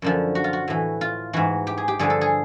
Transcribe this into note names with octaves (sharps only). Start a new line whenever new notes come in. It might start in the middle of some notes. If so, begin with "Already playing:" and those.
F#2 D3 F3
F#4
F4
F#4
A2 E3
F4
G#2 E3 F#4
G4
G#4
G4
G2 D3 F3 G#4
A4
G#4